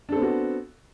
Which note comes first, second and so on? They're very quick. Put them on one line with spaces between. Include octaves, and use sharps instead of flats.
D4 A4 C4 B3 F#4